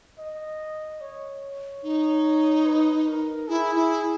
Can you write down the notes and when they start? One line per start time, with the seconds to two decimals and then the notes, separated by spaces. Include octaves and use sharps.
0.18 D#5
1.01 C#5
1.83 D#4
2.66 B4
3.07 A#4
3.48 E4 G#4
3.75 E4